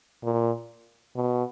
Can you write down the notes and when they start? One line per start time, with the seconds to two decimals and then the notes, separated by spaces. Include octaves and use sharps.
0.23 A#2
1.16 B2